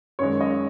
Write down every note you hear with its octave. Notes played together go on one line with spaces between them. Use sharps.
F#2 D#3 G#3 C#5
D#5